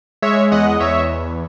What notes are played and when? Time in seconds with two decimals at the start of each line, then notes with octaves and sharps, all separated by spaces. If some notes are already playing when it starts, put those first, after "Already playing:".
0.22 G#3 C#5 E5
0.52 E2 D#5 F#5
0.69 D#5
0.80 E2 C#5 E5